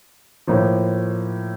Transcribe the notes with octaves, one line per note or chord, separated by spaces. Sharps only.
A2 F3 A#3